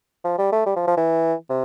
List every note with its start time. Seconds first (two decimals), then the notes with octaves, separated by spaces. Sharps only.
0.24 F3
0.38 G3
0.52 A3
0.66 G3
0.76 F3
0.87 F3
0.97 E3
1.50 C3